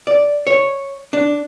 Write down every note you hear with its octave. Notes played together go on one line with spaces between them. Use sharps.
D5
C#5
D4